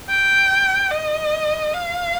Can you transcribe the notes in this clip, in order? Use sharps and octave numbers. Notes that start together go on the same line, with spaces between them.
G5
D#5
F5